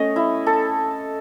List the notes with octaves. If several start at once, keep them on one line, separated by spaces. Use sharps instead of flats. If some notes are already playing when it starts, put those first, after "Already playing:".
Already playing: A3 C#4 D#5
E4
A4